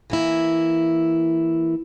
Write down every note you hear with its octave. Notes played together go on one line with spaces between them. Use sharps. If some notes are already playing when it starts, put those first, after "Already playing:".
E3 A#3 E4